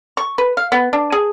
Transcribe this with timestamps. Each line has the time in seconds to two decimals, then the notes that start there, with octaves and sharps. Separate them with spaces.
0.17 C#6
0.38 B4
0.57 F5
0.72 B3
0.93 D4
1.12 G#4